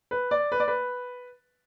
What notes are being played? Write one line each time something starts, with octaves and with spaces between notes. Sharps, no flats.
B4
D5
B4
D5
B4